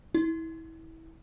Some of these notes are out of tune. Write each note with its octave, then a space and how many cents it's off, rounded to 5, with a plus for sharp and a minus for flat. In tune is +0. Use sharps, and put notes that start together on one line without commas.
E4 -25